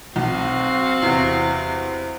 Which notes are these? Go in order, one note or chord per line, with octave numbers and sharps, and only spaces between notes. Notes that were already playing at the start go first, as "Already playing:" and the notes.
B1 C4 F#4 F5
E2 C3